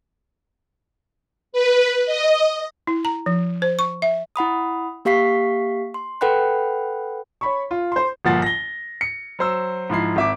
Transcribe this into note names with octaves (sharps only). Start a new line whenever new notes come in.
B4
D#5
E4
A#5
F3
C5
C#6
E5
E4 F#5 B5 D#6
A#3 G4 F5 C#6 B6 C7
C6
A4 B4 F#5 G5 B5 F#6
C#5 B5 C#6
F4
C5 C6
G1 A#2 F3 F#5 A6 C7
A#6 G7
C#7
F#3 C5 E6
G#2 F3 E4 C7
G#1 E5 D6